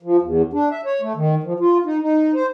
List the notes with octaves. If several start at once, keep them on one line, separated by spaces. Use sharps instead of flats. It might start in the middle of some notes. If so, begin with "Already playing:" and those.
F3
E2
D4
E5
C#5
A3
D#3
F3
F4
D#4
D#4
C5